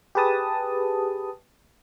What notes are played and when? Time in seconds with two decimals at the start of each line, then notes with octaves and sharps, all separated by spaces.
0.15 G4 G#4 B4 A5 D#6